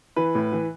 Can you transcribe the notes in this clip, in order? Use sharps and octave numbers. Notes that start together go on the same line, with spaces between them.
E3 B4
A2
E3